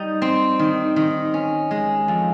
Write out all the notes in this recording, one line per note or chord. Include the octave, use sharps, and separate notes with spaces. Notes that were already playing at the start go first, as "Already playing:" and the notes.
Already playing: G3 D#4
C4
D#3
D#3
C#4
G#3
F2